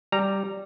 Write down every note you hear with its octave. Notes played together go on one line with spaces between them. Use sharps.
G3 A#5